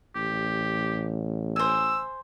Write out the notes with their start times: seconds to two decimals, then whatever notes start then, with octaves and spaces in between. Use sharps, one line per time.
0.15 A1 G4
1.56 C5 G#5 E6